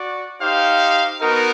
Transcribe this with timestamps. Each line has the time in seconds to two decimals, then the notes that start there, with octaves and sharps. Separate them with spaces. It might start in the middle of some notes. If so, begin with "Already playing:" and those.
Already playing: F#4 D5
0.41 D#4 G4 C5 F5
1.21 B3 D#4 F#4 A#4